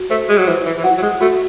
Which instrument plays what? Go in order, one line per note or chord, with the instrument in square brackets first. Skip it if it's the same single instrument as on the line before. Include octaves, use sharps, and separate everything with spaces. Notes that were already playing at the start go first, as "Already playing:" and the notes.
Already playing: [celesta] F#4
[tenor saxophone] A3 [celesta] C5
[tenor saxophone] G#3
F#3
[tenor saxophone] E3 [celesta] C5
[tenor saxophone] E3
E3
[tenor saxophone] F#3 [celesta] F#5
[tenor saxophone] F#3
G#3
[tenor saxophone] A3 [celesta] F#4